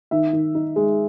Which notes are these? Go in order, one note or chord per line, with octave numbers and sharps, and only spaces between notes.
D#3 E5
D#3
D#4
G#3